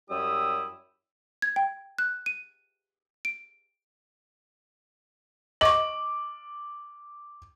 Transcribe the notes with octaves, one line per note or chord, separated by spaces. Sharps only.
F#2 G3 E4 G4 D#6 E6
G#6
G5
F#6
D#7
D7
D#5 C#6 D6 F#7